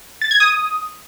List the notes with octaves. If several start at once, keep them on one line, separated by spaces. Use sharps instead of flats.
A6
G#6
D#6